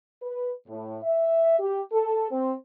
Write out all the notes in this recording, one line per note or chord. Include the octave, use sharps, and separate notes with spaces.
B4
A2
E5
G4
A4
C4